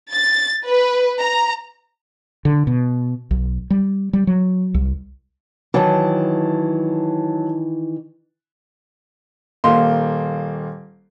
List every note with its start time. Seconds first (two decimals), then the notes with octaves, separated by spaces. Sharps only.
0.13 A6
0.67 B4
1.20 A#5
2.45 D3
2.67 B2
3.31 B1
3.70 G3
4.13 G3
4.27 F#3
4.74 C2
5.74 D#3 E3 F#3 A5
9.64 D#1 A#3 C6